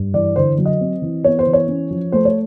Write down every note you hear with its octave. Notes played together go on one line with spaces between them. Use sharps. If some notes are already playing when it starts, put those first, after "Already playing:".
Already playing: G2
E3 D5
D3 C5
F#3
D#5
C4
E3
B3 C#5
C5
E3
C#5
C#4
F3
A3 C5
C#5